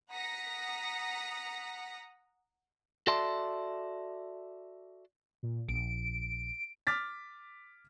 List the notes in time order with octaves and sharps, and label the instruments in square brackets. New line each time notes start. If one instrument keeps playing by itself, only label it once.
[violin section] F#5 A#5 D#6 A#6 B6 C#7
[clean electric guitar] F#4 A4 D5 E5 A5 C6
[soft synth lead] A#2
[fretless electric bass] A#1 [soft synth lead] D7
[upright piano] D6 F6 A6 B6